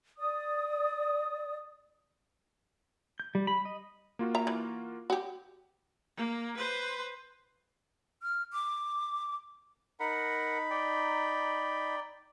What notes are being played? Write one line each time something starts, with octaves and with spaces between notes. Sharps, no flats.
D5 D#6
G6
G3
B5
D#5
A#3 F4 F#4
E5 A#5
E3
F#4 G4
A#3
B4 C5
F6
D6
D#4 A#4 F#5 B5
D5 G5